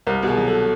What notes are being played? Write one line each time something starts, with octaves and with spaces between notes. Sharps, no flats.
C2 A#4
B2
G#4
F#3
A4